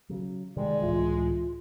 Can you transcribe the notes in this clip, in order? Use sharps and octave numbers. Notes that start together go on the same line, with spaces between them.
C#3 F#3
C3 D#3 G3 G#3 D5
C#2 A2 E3 F4